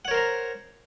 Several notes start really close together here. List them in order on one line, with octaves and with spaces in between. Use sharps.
F#5 C#5 A#4 C5 A#5